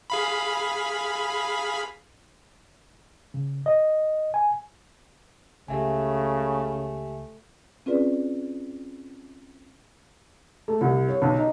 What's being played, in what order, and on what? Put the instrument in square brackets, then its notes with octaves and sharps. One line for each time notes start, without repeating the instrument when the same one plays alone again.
[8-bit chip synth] G#4 F5 B5
[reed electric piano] C#3
D#5
G#5
[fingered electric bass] C#2 [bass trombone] C#3 [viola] A3 [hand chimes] G4 E5 G#5
[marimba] C4 C#4 F4 G#4 B4 D5
[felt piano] A3
C2
C#5
B1
D#4